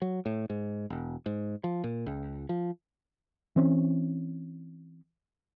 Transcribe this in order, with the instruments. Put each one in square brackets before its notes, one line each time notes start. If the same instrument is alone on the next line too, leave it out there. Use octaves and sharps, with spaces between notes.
[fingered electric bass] F#3
A2
G#2
E1
G#2
F3
A#2
C#2
F3
[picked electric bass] E3 C4 C#4